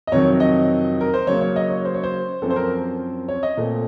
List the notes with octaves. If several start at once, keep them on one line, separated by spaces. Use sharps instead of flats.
D#5
F2 C3 D#3 F#3 C#5
D#5
A#4
C5
C#3 F#3 A#3 C#5
C#5
D#5
C#5
C5
C#5
C5
F#2 F3 C4 A4
C5
A#4
C#5
D#5
A#2 A3 C4